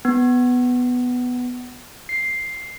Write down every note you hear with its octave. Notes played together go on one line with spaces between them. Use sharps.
B3
C7